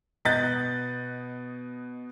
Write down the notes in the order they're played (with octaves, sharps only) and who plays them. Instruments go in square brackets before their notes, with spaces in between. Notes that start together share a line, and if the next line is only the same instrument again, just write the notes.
[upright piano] B2 B3 D#5 F#6 G6 A6